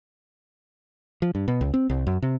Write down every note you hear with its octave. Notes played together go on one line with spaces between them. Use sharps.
F3
G2
B2
C#2
C4
C2
F#2
C3